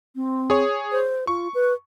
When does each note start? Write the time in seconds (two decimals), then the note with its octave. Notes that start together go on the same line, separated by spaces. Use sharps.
0.15 C4
0.50 G#4 C#5
0.92 C5
1.27 F4 C#6
1.54 B4